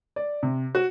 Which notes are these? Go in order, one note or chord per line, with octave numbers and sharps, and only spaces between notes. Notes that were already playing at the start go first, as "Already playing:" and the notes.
D5
C3
F#4